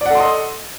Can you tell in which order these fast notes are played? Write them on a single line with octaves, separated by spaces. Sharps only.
D5 F#5 A4 C6 D#5